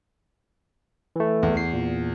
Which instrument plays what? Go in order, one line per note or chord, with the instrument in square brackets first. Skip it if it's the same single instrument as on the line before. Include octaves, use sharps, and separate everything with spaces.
[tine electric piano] E3 A3
[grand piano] E2
[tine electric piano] C7
A#2